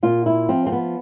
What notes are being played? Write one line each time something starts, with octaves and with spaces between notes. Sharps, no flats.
A#2 F4
E4
F3 C4
C4
B3